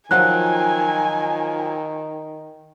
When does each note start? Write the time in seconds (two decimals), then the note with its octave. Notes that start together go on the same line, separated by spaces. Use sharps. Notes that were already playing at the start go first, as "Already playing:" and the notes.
0.11 D#3 F3 F#3 F4 C5 F#5 G#5 F#6